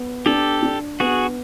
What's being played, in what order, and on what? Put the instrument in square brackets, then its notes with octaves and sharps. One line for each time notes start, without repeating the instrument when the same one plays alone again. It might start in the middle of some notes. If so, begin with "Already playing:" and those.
Already playing: [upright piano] B3
[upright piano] D4 [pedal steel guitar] G4 A4
[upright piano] D4
[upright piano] B3 [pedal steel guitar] F#4 G#4